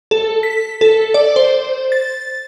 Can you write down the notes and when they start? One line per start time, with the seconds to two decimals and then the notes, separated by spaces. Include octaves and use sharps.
0.11 A4
0.43 B6
0.81 A4
1.14 D5
1.36 C5
1.92 A6